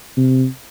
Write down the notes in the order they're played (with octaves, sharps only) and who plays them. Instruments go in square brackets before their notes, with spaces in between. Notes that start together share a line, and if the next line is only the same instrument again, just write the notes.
[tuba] C3